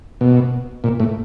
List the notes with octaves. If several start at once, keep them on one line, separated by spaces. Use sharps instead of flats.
B2
A#2
A2